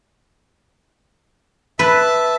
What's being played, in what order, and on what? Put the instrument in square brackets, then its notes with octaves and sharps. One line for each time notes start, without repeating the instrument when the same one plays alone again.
[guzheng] B4 [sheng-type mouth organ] E5 A5